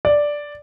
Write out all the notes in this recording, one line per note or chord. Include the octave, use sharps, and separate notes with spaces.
D5